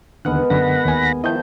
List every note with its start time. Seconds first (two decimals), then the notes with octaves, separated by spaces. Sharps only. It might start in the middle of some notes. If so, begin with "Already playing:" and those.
0.25 D#2 D3 G#3 B3 A#4 F#5 F#6
0.50 F#2 D3 F#5 B5 A#6
0.85 D#2 G#5
1.24 D#3 F3 E4 D#5 A5 G6